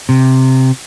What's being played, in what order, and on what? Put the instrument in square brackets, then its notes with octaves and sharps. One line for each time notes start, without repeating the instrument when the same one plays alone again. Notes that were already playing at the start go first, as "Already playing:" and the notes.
[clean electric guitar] C3